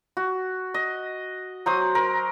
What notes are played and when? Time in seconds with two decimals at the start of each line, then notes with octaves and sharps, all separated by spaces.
0.17 F#4
0.74 D#5
1.66 F#3 C5 D#6
1.95 A#4